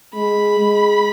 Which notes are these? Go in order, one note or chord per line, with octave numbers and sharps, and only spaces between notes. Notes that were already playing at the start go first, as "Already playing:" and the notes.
G#3 B5
G#3